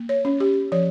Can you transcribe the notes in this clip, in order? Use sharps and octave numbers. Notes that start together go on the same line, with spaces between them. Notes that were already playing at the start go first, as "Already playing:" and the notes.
Already playing: A#3
C#5
C#4
G4
F3 C#5